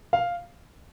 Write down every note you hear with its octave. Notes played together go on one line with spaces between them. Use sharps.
F5